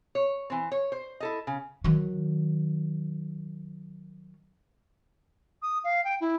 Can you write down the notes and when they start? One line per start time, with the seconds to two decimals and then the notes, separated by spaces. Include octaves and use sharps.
0.15 C#5
0.50 E3 C4
0.72 C#5
0.92 C5
1.20 E4 A4 D#5
1.47 C#3
1.84 D#3 F#3
5.62 D#6
5.84 F5
6.04 G5
6.21 E4